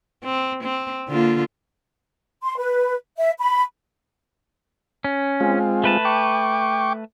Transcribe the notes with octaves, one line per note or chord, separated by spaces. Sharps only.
C4
C4
D3 A#3 F4
C6
B4
E5
B5
C#4
G#3 C4 F4
A3 B4 A5
G5 C#6 D6